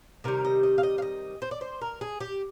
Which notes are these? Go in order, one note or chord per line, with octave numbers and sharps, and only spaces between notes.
C3 D#3 G3 A#4
D#5
D#5
F5
D#5
F5
D#5
C5
D5
C5
A#4
G#4
G4